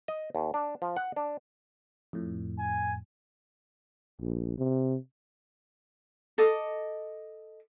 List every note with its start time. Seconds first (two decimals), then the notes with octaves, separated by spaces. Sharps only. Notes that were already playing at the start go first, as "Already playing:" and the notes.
0.08 D#5
0.35 D#2
0.54 D4
0.82 F3
0.97 F#5
1.16 D4
2.13 F2 A2
2.59 G#5
4.20 A#1
4.58 C3
6.38 A4 D#5 D6